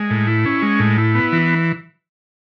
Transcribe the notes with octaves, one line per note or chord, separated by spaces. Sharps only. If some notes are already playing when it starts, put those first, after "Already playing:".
Already playing: G#3
A2
E4
C#4
G#3
A2
E4
B3
E3